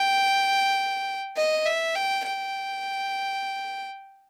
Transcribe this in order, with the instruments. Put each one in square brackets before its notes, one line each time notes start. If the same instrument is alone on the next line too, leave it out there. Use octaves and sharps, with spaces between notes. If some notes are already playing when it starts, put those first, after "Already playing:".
Already playing: [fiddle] G5
D#5
E5
G5
G5